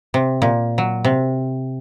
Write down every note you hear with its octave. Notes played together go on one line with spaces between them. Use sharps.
C3
A#2
F#3
C3